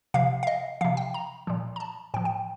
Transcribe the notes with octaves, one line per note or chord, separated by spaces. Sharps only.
C3 F3 F5
F5
D#5
C3 F3 F5
G5
A#5
A#2 F3
A#5
A5
A2 F3 G5
G5